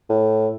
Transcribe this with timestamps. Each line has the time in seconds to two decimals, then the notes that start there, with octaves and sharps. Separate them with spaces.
0.10 A2